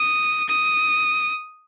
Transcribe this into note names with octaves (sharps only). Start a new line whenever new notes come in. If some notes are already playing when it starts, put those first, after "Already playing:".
Already playing: D#6
D#6